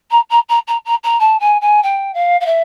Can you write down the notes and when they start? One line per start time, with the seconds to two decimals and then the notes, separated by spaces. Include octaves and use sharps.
0.11 A#5
0.30 A#5
0.49 A#5
0.67 A#5
0.85 A#5
1.04 A#5
1.20 A5
1.40 G#5
1.61 G#5
1.83 G5
2.14 F5
2.41 F5
2.46 E5